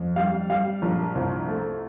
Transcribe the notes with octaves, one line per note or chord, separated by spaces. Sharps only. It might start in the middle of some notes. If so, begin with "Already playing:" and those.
Already playing: F2
G3 F5
G3 F5
A#1
C2
A3